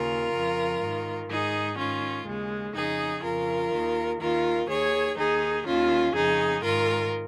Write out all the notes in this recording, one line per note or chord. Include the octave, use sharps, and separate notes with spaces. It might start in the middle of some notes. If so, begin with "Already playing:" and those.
Already playing: D#2 C#3 F4 A#4
F2 C#3
G#2 D#3
G#2 D#3 D#4 G#4
G#2 D#3 C#4 F4
D#2 C#3 G#3
F2 C#3 D#4 G#4
F2 C#3 F4 A#4
D#2 D#3
D#2 D#3 F4 A#4
D#2 D#3 G#4 C#5
D#2 D#3 D#4 G#4
D#2 D#3 C#4 F4
F2 C#3 D#4 G#4
G#2 D#3 F4 A#4